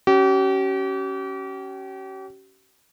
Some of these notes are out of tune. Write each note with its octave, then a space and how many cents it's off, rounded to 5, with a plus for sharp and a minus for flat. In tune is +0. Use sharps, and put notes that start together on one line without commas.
C#4 +0 G4 -40